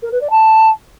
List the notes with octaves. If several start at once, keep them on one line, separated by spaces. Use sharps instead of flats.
A#4
B4
D5
A5